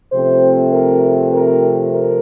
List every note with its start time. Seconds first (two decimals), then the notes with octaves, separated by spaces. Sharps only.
0.12 C3 F3 A3 C4 C5
0.72 A#4
1.32 A#4
1.91 A#4